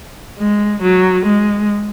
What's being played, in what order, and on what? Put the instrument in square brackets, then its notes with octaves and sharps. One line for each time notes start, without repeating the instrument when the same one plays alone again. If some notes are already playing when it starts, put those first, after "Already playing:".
[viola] G#3
F#3
G#3